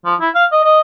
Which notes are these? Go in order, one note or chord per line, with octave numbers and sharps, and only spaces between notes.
F3
E4
F5
D#5
D#5